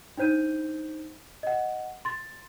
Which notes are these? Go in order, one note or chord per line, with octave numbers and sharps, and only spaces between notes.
D4 D#4 C5 G6 D#7
D#5 F#5
C6 A6